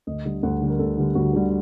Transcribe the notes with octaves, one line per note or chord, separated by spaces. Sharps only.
D2 D#5
D3 G3
D2 F#5
D3 G3
A#4
D2 A4
D3 G3
D2 F#4
D3 G3